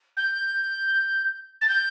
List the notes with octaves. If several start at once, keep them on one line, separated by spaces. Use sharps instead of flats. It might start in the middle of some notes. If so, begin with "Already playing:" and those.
G6
A6
G6